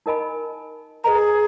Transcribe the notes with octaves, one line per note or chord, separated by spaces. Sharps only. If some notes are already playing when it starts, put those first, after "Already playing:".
D#4 A#4 D#5 G#5 B5
G#4 A#4 B4 D#5 A#5